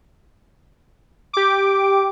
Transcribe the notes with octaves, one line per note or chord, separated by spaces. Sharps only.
G4 D6